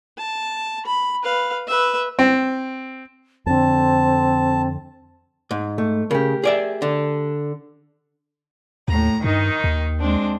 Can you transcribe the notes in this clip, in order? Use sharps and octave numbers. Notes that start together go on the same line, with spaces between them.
A5
B5
B4 F5
B4 E5
C4
F2 D3 C4 A5
G#2
A3
C#3 G4 A#4
G#4 D5 E5
D3
D#2 A2 A#5
G2 D#3 D#4
D#2
G#3 C4 D4